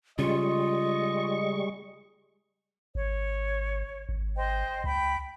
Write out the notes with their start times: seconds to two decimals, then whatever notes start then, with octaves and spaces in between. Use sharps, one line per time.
0.19 C#3 G3 G#3 F4 D#5 C#6
2.95 G#1 C#5
4.09 G#1
4.36 C5 D#5 G5
4.84 C#2 G5 B5